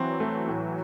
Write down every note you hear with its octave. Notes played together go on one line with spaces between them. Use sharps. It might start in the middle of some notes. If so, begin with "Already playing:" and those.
Already playing: E3 F#3 C4
A3
A2